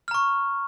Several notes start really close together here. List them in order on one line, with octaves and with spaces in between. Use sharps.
F6 A#5 C#6